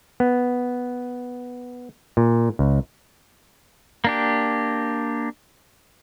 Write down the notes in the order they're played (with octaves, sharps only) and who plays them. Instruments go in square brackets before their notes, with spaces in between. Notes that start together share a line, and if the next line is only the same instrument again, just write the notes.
[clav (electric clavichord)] B3
A#2
C#2
[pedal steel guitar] A#3 D4 G4